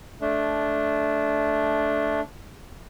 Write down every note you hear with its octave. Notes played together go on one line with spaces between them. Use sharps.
A3 D4